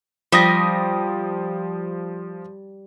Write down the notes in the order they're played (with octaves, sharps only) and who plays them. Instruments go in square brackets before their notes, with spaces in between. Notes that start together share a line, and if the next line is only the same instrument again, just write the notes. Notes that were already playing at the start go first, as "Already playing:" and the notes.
[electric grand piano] F3 D#6 A#6 [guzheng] G3